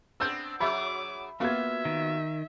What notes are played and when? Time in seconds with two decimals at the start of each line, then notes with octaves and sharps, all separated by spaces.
0.20 B3 C4 D4 E6 G6
0.60 F#3 G#4 C#5 E5 B5 D6
1.40 A#3 B3 F4 F#4 E5 G#6
1.85 D#3